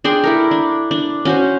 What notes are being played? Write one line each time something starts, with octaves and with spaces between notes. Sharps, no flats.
D4 G#4 G5 C6
E4 A4 A#4
D4
D4
C#4 F#4 C5